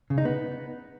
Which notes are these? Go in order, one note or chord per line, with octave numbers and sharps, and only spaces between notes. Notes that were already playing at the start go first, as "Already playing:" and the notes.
C#3
D#4
B3